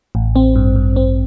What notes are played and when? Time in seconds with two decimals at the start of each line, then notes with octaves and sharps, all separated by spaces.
0.15 A1
0.36 C4
0.55 G2
0.76 G2
0.96 C4